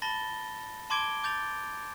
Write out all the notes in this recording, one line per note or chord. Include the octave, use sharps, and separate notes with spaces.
A5 B5 A6 A#6 G7
A5 C6 D6 G#6 D7 G7
D6 G6 A6 F7